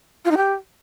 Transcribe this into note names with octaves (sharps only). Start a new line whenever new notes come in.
F4
D#4
G4